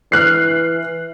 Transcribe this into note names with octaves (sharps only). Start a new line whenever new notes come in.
E3 F6 F#6 C7